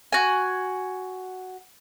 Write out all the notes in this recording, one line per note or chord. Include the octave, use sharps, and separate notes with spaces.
F#4 G#5